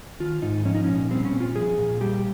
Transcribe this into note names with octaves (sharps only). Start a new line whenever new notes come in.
D#3 F4
G#2 D#4
F3 C#4
D#4
A#2 C#4
G3 C4
C#4
A#2
F4
F3 G#4
A#2
G3 G4